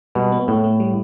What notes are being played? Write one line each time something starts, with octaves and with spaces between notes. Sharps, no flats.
B2 G3
B3
A2 A3
A3
G3